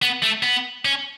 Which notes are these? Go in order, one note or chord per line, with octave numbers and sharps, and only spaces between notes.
B3
A3
B3
C#4